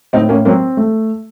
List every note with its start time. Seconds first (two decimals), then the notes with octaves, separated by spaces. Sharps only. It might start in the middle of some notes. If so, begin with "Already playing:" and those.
0.13 A2 C4 D#4
0.29 A#3 C#4
0.45 F#3 A#3 C4
0.77 A3